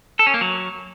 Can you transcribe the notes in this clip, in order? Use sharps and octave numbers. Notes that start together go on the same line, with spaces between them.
A4
C#4
A#3
F#3